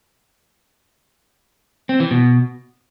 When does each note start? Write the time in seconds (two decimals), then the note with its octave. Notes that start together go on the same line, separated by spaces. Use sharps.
1.89 C4
2.00 E3
2.11 B2